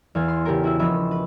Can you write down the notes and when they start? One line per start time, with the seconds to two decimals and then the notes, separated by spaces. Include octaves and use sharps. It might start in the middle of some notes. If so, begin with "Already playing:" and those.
0.15 E2 F5 G#6
0.28 C6
0.45 C#3 G4 A4 A#4
0.63 E4 F#4 E5
0.79 E1 F3 C#4 E5 B5
1.11 B4